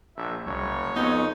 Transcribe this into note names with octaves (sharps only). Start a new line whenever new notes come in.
A#1 E5
F#1 C2 C#5
F2 B3 D#4